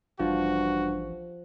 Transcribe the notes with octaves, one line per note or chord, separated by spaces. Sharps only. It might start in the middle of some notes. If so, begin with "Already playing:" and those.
A1 G2 F3 F#4